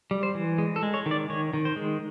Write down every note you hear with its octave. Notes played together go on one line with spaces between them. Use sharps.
G3
C5
E3
G#3
A4
G#3
C#5
D#3
D5
D#3 C#5
D#3
C5
G#3